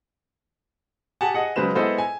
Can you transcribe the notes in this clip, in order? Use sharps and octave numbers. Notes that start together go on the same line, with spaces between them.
G4 G#4 F#5 G#5 A5
G#4 D#5 F#5
C#3 F#3 G#3 B4 C5 E7
G#3 B3 E4 A4 C5 D#5
G#5